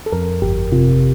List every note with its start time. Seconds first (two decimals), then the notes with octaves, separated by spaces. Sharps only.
0.06 A4
0.12 F2 A#4
0.42 G1 G4
0.72 C3 F4